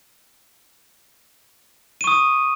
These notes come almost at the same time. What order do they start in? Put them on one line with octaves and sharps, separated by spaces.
D#7 C#6 D#6